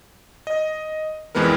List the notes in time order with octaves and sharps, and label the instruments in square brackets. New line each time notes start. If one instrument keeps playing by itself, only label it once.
[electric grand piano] D#5
A#1 F2 E3 G#3 B3 A#4